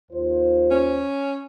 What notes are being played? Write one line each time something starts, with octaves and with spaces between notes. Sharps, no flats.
D#2 F4 C5
C#4